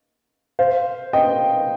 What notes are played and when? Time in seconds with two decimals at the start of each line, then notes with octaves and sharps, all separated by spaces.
0.59 C5 F5
1.13 D#5 G5